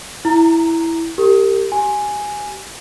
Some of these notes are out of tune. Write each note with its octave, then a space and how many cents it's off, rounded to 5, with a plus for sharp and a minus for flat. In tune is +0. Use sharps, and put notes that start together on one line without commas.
E4 +0 A#5 -5
G4 +0 A#4 -35
G4 -30 G#5 +0